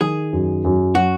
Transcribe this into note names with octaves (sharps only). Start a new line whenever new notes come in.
D#3 G#4
F#2
F#2
F#3 F#4